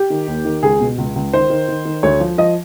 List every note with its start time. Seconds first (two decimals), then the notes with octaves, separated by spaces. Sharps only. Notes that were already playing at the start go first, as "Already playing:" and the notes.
Already playing: G4
0.10 D#3
0.27 D#2
0.45 D#3
0.63 C#2 G#4
0.80 B2
0.98 C#2
1.16 C#2
1.33 D#3 C5
1.50 D#3
1.68 D#3
1.85 D#3
2.03 D2 C#5
2.20 F3
2.38 F3 D#5